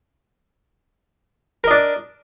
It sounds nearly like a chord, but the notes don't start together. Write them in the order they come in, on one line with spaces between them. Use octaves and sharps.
A#4 D#5 D4